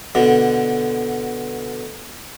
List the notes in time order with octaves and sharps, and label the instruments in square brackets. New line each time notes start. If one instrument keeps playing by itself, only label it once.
[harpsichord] B2 D3